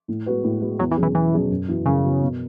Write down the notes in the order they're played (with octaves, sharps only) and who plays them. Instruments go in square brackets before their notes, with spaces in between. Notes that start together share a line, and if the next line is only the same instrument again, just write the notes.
[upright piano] A2
G#3 B3 F#4 B4
A2
G#3 B3 F#4 B4
[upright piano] E2 [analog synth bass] F#3
[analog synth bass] E3
[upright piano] B2 F#3 C#4 G#4
[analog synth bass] E3
[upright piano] E2 [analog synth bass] E3
[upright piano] B2 F#3 C#4 G#4
F#2
E3 B3 F#4
[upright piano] F#2 [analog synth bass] C#3
[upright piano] E3 B3 F#4
B2